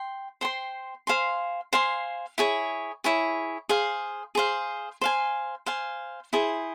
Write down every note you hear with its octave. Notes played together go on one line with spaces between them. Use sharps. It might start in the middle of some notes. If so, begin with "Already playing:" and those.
Already playing: G5 C6
C5 G5 C6
C5 F5 G#5 C6
C5 F5 G#5 C6
E4 G#4 C#5
E4 G#4 C#5
G#4 C5 F5
G#4 C5 F5
C5 F5 G#5
C5 F5 G#5
E4 G#4 C5